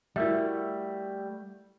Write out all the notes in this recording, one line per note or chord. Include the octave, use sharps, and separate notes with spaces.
G3 A3 E4 F#4 A#4 E5